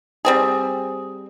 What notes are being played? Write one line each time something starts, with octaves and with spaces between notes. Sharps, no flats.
G3 C4 G#4